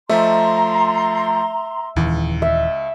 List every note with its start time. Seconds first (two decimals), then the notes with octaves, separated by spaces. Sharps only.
0.09 F3 A3 E5 A#5 C6
1.96 D#1 C#2 D#3 E3
2.42 E5